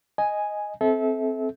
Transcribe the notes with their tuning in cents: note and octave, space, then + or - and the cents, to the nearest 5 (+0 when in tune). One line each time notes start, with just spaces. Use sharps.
D#5 +0 G#5 +0
C4 +0 A4 -30 E5 -25